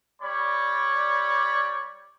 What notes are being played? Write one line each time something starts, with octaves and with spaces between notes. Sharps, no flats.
G3 C#5 D5 B5